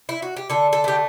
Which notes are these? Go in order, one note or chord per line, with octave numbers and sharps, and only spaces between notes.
E4
F#4
G4
D3 A4
A4
A3 G4